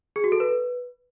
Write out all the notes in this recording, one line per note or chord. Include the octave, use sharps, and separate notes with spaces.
G#4
F#4
A4
B4